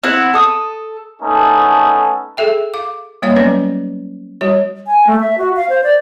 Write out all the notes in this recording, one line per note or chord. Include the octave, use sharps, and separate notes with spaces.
C4 E4 F#5
A4 D#6
A3 B3 C#4 D#4 A4
G#4 A4 E5 G5
F5 D6
G3 A#3 C#5 D#5 F5
F#3 B3 C#4 B4
G3 F#4 C#5
G#5
A3
E5
F#4
F5
C5
D5